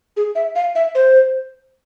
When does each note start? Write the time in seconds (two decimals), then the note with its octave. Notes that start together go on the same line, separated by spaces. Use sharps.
0.17 G#4
0.35 E5
0.55 F5
0.75 E5
0.95 C5